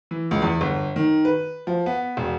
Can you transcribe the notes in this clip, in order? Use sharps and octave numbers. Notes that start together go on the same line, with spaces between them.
E3
C#2
E2
G1
D#3
B4
F3
B3
E1